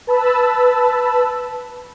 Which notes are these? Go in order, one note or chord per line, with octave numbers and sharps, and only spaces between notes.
B4 A5 B5 E6